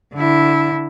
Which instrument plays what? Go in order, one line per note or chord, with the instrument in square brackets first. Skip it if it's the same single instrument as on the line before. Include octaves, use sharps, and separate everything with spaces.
[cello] D3 E4